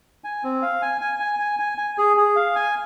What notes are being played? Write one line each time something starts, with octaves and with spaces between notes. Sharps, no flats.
G#5
C4
F5
G#5
G#5
G#5
G#5
G#5
G#5
G#4
G#4
F5
G#5